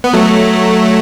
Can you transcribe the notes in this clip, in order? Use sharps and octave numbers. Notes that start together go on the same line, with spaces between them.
B3
F#3 A3